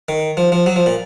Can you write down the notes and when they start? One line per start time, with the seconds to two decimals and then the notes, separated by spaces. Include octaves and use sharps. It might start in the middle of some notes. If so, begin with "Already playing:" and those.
0.09 D#3
0.37 F3
0.52 F3
0.66 F#3
0.76 F3
0.86 A#2